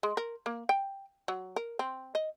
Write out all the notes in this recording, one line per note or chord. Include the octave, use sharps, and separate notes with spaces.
G#3
A#4
A#3
G5
F#3
A#4
C4
D#5